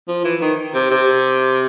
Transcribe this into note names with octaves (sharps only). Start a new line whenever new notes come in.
F3
E3
D#3
C3
C3